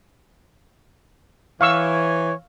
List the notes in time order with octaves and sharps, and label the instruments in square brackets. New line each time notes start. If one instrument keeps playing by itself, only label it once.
[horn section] E3 C#5 [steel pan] F5 C#6 E6